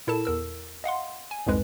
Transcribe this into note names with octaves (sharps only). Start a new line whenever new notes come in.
A#2 E4 A4 A#4 A5 E7
E2 A#4 E6
D#5 F5 F#5 C6
G#5
C2 F2 G#2 G#3 B4